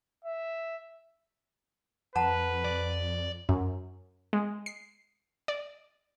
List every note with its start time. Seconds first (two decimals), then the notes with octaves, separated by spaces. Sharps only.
0.25 E5
2.16 F2 B4 F#5 A5 A#5
2.65 D5
3.49 F#2
4.33 G#3
4.66 C7
5.48 D5